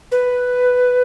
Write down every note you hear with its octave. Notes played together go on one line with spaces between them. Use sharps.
B4